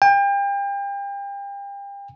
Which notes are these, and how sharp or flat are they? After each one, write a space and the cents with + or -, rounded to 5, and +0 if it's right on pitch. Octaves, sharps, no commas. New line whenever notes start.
G5 +35